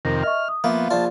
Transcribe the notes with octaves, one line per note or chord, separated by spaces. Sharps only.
F2 C3 D#3 A#4 A#6
D#5 E5 C#6 F6
D#6
F3 A#3 B3 E5 F5
A#1 F4 D5 A5